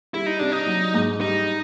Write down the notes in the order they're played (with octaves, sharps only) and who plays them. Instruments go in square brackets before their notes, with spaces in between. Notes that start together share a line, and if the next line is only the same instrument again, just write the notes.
[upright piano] G3 [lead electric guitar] E4
[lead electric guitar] D#4
[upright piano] C3 [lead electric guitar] D4
[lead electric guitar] D#4
[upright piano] F#3
G#2
[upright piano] G3 [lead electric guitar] D#4